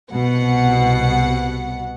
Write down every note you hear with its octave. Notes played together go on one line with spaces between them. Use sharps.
C2 B2 F#5